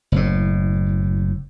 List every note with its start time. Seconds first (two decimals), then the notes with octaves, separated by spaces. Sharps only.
0.12 F#1 A2